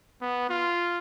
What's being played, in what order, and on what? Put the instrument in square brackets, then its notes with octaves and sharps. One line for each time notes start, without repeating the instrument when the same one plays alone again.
[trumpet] B3
F4